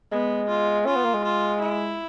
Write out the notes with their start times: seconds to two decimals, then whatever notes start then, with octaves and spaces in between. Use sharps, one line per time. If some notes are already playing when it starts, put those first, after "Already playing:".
0.12 G#3 B3
0.49 F4
0.86 C#4 F4
0.96 B3
1.05 A#3
1.14 G#3
1.24 F4
1.61 E4